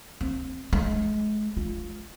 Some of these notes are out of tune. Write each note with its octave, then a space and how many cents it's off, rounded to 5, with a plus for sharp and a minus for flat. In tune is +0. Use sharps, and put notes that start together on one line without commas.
C4 +10
G#3 +35
F4 +0